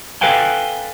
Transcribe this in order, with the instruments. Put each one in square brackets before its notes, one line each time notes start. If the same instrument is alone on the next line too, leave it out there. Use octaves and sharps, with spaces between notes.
[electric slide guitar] A4 B4 F5 G5 G#5